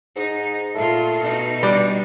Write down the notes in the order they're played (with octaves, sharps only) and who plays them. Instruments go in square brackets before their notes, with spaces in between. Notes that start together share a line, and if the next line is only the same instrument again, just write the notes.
[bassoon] G#2 [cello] D#4
[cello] A#2 F4 [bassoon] A3
[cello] B2 D#4
[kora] G3 [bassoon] D4